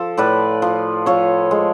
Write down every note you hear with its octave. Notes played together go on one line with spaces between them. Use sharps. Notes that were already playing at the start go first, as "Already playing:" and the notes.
Already playing: F3 A4
A2 B4 D5
F3
F3 A4 C#5
G#3